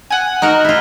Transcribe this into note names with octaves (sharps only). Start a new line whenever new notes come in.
F#5 G#5
D#4 F#4 A#4
E4 F4